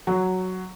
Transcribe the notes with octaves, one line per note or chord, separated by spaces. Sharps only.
F#3